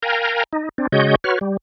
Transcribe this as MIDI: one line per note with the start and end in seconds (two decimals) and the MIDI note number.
0.02 0.44 70
0.02 0.44 77
0.02 0.44 79
0.02 0.44 80
0.02 0.44 82
0.53 0.69 63
0.78 0.87 60
0.78 0.87 62
0.92 1.15 49
0.92 1.15 56
0.92 1.15 66
0.92 1.15 73
0.92 1.15 75
0.92 1.15 91
1.24 1.39 66
1.24 1.39 71
1.24 1.39 73
1.24 1.39 89
1.41 1.57 55